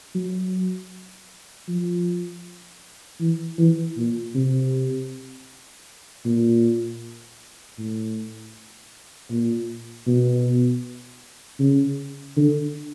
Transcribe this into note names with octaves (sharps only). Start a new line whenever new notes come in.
F#3
F3
E3
E3
A#2
C3
A#2
A2
A#2
B2
C#3
D3